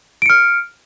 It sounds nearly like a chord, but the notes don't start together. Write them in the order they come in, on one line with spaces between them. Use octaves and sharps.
D7 C#7 F6